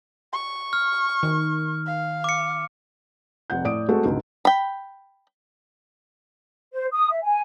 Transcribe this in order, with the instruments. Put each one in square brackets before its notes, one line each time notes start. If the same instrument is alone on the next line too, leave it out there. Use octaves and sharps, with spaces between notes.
[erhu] C#6
[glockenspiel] F6
[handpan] D#3
[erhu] F5
[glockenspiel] D6 C#7
[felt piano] F1 F2 F#5 G6
A2 D5 D#6 D7
G#3 A3 C4 F#4 G#4 A4
C#2 G#2 B2 D3
[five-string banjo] G5 B5
[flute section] C5
D#6
E5
G#5